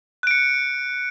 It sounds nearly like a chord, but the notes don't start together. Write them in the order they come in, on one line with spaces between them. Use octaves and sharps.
F#6 D7 C#7